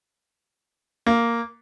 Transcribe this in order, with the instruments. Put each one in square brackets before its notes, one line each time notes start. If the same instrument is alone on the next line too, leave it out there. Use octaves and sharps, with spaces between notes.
[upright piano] A#3